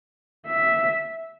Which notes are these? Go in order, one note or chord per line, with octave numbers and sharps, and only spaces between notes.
E5